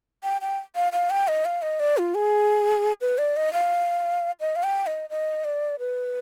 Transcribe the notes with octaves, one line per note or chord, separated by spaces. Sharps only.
G5
G5
F5
F5
G5
D#5
F5
D#5
D5
F4
G#4
B4
D5
D#5
F5
D#5
F5
G5
D#5
D#5
D5
B4